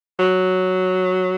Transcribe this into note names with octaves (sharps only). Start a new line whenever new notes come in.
F#3